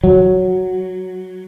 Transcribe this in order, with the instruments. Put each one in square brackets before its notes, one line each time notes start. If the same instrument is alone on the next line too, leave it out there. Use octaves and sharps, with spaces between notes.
[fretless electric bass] F#3